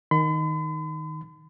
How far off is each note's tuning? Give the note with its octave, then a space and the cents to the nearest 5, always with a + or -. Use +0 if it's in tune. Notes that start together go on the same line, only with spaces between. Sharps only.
D#3 +0 B5 +45